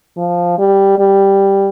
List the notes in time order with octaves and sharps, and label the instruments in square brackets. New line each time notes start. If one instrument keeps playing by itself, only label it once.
[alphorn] F3
G3
G3